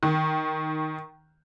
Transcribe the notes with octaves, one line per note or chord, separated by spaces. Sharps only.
D#3